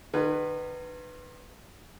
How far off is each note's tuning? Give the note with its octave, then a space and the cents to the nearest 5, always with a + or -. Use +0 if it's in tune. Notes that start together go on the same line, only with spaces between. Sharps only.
D#3 -40 B4 +5